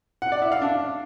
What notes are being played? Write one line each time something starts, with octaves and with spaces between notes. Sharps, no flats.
F#5
D5
E4
F5
D4